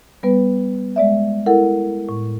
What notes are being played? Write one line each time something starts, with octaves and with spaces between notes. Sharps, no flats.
G3 B3 B4
G#3 D5 E5
E4 A4 A#4 F#5
A2